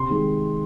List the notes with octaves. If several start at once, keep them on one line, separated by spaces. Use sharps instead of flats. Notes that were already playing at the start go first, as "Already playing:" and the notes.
Already playing: C3 C6
D#3 G#3